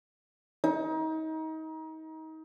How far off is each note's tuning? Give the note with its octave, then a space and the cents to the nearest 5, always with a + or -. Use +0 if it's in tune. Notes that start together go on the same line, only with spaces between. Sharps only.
D#4 +30